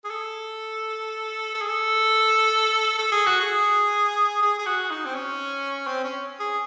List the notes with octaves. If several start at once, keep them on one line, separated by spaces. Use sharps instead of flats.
G#4
A4
A4
G#4
A4
A4
G#4
F#4
G#4
G#4
G#4
F#4
D#4
C4
C#4
C4
C#4
G#4